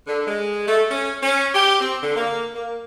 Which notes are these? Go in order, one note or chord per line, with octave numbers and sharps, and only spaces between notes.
D3
G#3
A3
C#4
C#4
G4
C4
D3
A#3
A#3